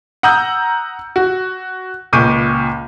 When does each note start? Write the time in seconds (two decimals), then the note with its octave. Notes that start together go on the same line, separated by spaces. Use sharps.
0.23 F#5 A#5 D#6 E6 G6
1.16 F#4
2.13 C#2 A#2 C#6 D6 G6 D#7